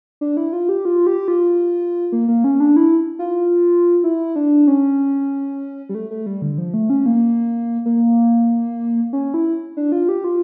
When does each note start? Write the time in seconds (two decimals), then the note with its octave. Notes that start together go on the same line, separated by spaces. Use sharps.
0.21 D4
0.37 E4
0.53 F4
0.69 G4
0.85 F4
1.07 G4
1.28 F4
2.12 A#3
2.28 A#3
2.44 C#4
2.60 D4
2.76 E4
3.19 F4
4.04 E4
4.36 D4
4.67 C#4
5.89 G3
5.95 A3
6.11 A3
6.26 G3
6.42 D3
6.58 F3
6.74 A3
6.90 C#4
7.06 A#3
7.86 A#3
9.13 C#4
9.34 E4
9.77 D4
9.92 F4
10.09 G4
10.24 F4